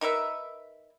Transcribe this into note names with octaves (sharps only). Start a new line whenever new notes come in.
D#4 A#4 B4 E5